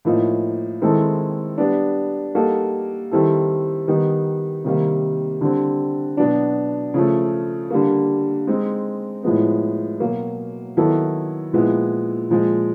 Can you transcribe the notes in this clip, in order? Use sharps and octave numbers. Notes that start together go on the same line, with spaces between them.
A2 F3 A#3 D#4
D#3 G#3 C4 E4 A4
G3 B3 D4
G3 A#3 D#4 F#4 A4
D#3 G3 C4 E4 A4
D#3 G3 B3 D#4
C3 D#3 G3 A#3
D3 G3 C4
B2 F#3 B3 D4
C#3 F3 A3
D3 G3 A#3
G#3 C4 D#4
A2 F3 G#3 B3
B2 F#3 A#3
D#3 F#3 B3 E4 A4
A#2 F3 G#3 B3 E4
A#2 F3 G#3